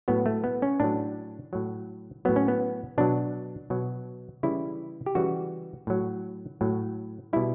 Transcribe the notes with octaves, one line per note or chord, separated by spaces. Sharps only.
A2 F#3 B3
A3
B3
C#4
A2 F#3 D4
A2 F#3
A2 F#3 B3
C#4
B3
B2 F#3 D4
B2 F#3
C#3 E3 G3 E4
G4
C#3 E3 G3 F#4
A2 F#3
A2 F#3
B2 G3 E4